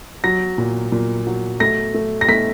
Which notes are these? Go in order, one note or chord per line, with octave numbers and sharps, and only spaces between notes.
F#3 A#6
A#2
A#2
F#3
A3 A#6
A3
A#6
A3 B6